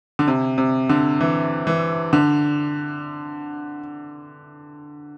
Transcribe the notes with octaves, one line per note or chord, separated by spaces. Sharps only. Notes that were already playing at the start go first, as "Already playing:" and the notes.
D3
C3
C3
D3
E3
E3
D3